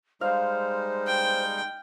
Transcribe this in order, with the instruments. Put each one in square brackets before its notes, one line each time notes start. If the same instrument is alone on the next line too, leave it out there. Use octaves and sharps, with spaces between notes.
[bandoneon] G3 G#3 D#4 [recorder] C5 [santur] F5
[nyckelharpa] G5